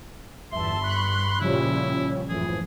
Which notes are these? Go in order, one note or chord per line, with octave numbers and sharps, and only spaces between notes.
G1 E2 E5 A5 C6
G2 B5 C#6 F#6
A#2 C#3 F3 G3 C#4 E4
F#1 A2 E3 F3 G#4